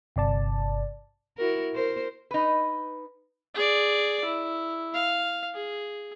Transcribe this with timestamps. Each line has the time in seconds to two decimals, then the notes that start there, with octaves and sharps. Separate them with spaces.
0.16 G1 C3 D5 A5
1.37 E4 F#4 A#4
1.74 A#4 C5
2.31 D#4 B4
3.54 G#4 D5
4.25 E4
4.94 F5
5.53 G#4